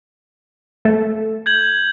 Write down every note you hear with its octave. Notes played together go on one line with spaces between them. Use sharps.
A3 A4
G6 G#6 F#7